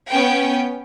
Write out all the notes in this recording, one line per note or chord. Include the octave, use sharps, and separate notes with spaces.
B3 C#4 G5